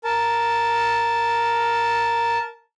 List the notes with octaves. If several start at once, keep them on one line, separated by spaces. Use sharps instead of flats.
A#4 A5